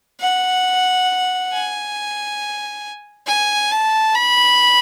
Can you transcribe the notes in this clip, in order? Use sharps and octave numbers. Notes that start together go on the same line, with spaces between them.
F#5
G#5
G#5
A5
B5